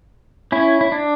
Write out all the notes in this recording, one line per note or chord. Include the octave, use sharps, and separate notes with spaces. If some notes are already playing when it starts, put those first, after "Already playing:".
C#4 E4
E4
D4